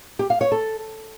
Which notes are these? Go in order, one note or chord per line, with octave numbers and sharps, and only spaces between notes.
G4
F5
C#5
A4